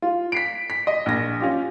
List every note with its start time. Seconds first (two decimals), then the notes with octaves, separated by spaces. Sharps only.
0.02 F4
0.32 B6 C7 D7
0.70 B6
0.87 D#5
1.06 A#1 A#6
1.40 C#4 F4 G4